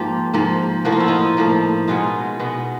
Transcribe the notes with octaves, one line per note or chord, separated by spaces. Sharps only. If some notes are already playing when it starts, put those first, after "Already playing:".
Already playing: G#2 F3 A#3 F4 G4
G#2 F3 A#3
A2 F3 A#3 F#4
F4
E4
D#4 F4
A2 F3 A#3
B2 G#3 B3 D#4 F4
B2 G#3 B3